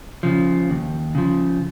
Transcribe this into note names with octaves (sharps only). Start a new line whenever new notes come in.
C#3 F3
D#2
C#3 F3